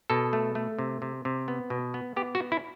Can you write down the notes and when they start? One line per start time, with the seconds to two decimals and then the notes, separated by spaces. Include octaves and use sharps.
0.10 B2 A4
0.33 A3
0.55 A3
0.79 C3
1.02 C3
1.25 C3
1.48 B3
1.70 B2
1.94 B3
2.16 B3 G4
2.35 F#4
2.40 B3
2.52 E4